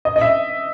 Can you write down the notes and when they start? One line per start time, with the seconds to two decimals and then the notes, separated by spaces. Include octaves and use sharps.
0.05 D#5
0.16 D#5
0.21 E5